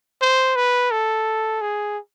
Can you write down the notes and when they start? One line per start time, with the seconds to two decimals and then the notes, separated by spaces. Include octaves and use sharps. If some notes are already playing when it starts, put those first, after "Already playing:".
0.21 C5
0.56 B4
0.91 A4
1.61 G#4